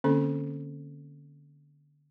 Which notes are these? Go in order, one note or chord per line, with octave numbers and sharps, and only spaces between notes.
D3 A#3 C4 C#4 A4 B5